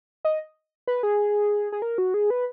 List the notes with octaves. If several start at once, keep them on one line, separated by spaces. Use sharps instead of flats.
D#5
B4
G#4
G#4
A#4
F#4
G#4
B4